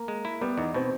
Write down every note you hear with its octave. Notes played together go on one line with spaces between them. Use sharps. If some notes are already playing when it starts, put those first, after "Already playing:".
Already playing: A#3
G#3
E4
G3 B3
E2 D#4
B2 C4